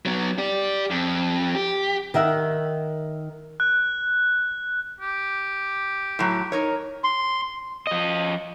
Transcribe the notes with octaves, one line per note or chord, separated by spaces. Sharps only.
F#3 B3
G4 D5
F2
G4
D#3 A#4 E5 F#5
F#6
G4
A2 F#3
D#4 A#4 C#5
C6
F3 D#5